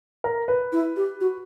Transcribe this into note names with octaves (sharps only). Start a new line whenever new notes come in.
A#4
B4
E4
G4
F#4